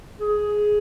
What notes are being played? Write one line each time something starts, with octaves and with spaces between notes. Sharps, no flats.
G#4